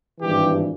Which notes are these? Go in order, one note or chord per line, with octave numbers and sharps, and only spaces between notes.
G#1 G2 E3 G4